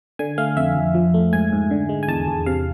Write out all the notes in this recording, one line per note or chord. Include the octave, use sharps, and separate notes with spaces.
D3 G#5
A3 F5
F2 E5
F2
F3
A3
G#2 G#5
G#2
D3
G#3
G#5
E2 A5
E2
C3 F5